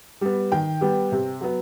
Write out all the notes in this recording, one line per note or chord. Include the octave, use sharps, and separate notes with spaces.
G3 B3
D#3 G5
G3 B3
C3
F#3 B3